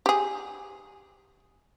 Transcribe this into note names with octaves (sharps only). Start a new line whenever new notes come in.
G4 G#4